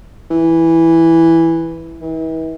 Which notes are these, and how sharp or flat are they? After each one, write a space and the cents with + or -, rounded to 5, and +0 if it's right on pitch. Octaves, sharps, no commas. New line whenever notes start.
E3 +0
E3 -40